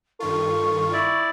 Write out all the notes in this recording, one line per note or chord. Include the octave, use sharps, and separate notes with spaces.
G2 D#3 F4 A4 C#6
E4 D5